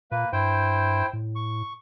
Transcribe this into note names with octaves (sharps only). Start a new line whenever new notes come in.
A#2 A#3 B4
G2 E4 C5 G5
A2
C#6